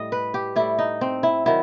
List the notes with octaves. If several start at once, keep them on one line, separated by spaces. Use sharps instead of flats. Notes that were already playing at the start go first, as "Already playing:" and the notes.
Already playing: A2 G3 D#5
B4
G4
A2 G3 E4
D#4
C4
E4
D#3 F#3 E4